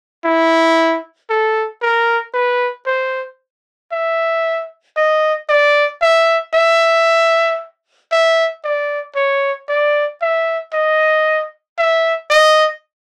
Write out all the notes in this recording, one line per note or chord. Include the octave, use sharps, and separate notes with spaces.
E4
A4
A#4
B4
C5
E5
D#5
D5
E5
E5
E5
D5
C#5
D5
E5
D#5
E5
D#5